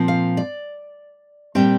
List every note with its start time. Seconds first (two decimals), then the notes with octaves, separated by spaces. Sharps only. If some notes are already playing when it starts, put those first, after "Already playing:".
Already playing: A#2 F3 C4
0.08 F5
0.37 D5
1.55 A#2 G3 C4 G5